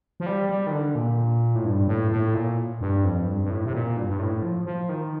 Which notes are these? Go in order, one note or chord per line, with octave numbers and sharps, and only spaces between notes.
F3
G3
G3
D#3
D3
A#2
A2
G2
A2
A2
A#2
G2
F2
G2
G2
A2
C3
A#2
G2
G2
A2
F3
F3
D#3